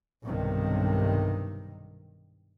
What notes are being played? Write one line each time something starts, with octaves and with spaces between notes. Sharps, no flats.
B1 G2 C3 D#3